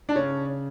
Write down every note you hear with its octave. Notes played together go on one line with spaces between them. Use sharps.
D4
C#3 C#4